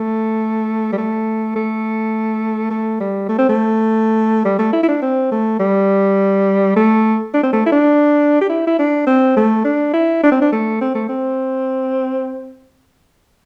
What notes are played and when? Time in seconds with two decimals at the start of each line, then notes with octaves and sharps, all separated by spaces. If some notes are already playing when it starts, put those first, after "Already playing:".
Already playing: A3
0.93 G3
0.98 A3
1.56 A3
2.71 A3
3.00 G3
3.29 A3
3.38 C4
3.49 A3
4.45 G3
4.59 A3
4.73 E4
4.83 E4
4.88 D4
5.02 C4
5.32 A3
5.60 G3
6.76 A3
7.34 D4
7.43 C4
7.53 A3
7.66 E4
7.72 D4
8.41 G4
8.50 E4
8.67 E4
8.79 D4
9.07 C4
9.37 A3
9.65 D4
9.94 E4
10.24 D4
10.32 C4
10.41 D4
10.52 A3
10.81 C4
10.95 A3
11.09 C4